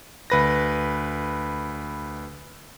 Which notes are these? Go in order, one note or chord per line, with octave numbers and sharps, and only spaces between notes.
D2 B4 A#6